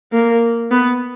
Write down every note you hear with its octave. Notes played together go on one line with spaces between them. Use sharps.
A#3
B3